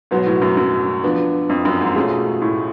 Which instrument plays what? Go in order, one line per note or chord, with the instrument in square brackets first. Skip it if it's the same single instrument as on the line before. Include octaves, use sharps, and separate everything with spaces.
[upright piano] G#2 [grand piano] B2 F#3 B3
[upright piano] A2
F#2
F#2
[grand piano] F3 B3 D4
[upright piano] F2
F#2
G#2
[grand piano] B2 A3 C#4 F4 G#4
[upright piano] A2